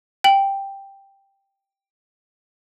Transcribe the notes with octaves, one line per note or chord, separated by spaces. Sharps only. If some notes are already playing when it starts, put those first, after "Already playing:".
G5 F#7